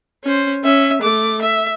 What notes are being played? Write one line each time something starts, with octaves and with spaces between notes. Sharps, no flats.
C#4 C5
C#4 E5
A3 D6
E5